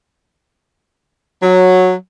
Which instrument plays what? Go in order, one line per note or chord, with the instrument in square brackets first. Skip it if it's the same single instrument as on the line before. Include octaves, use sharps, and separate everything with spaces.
[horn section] F#3